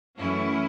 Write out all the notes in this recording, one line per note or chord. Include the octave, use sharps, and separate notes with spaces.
F#2 E3 A3 C#4 E4